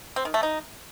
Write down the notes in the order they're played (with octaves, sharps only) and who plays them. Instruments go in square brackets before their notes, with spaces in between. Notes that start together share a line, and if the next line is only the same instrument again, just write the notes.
[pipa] C4
D#3
A3
D#4